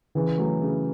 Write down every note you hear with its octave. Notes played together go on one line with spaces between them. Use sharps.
C#3 E3
F#3 A3
C#3